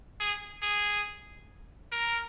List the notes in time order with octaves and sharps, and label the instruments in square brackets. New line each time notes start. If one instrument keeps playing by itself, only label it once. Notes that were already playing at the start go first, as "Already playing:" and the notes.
[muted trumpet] G#4
G#4
A#4